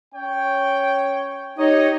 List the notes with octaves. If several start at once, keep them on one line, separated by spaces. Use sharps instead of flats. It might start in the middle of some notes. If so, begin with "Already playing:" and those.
C#4 C#5 G5
D#4 G4 C#5 D#5